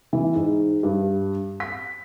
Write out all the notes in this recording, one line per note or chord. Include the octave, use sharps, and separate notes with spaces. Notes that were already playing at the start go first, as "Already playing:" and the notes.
E3
G#2
G2
B6